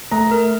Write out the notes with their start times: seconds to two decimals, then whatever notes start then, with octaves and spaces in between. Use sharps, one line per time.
0.11 A3 A#5
0.31 A#4